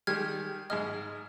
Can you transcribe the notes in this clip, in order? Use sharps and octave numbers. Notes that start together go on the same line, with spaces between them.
D#3 G3 G#3 F6 G#6
G#2 G#3 D#5 F6